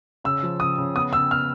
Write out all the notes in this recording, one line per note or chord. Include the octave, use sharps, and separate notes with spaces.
C#3 E6
F3
C#3 D#6
C#3
B3 D#6
C#3 E6
B3 F6